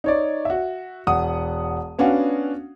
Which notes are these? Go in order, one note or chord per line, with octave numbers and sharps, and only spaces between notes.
D#4 C#5 D5
F#4 E5
E1 F#5 D#6
B3 C#4 D4 F#4 F5 F#5